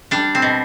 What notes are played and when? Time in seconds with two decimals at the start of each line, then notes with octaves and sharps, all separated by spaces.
0.11 G3 D4
0.35 C4
0.42 B2